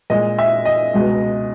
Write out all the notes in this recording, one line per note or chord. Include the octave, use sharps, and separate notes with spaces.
A#2 G#3 D#5
E5
D#5
C#2 B2 G#3